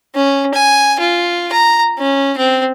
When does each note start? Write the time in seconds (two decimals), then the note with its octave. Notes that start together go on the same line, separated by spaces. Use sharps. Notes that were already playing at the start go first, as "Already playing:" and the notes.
0.15 C#4
0.54 G#5
0.99 F4
1.52 A#5
1.99 C#4
2.38 C4